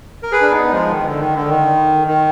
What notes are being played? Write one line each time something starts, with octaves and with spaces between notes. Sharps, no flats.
A#4
G#4 B4
D4
B3 D#4
F3 G#3
D#3
D3
D#3
D3
D#3
D#3